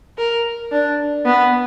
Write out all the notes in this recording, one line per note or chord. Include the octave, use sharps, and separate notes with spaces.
A#4
D4
B3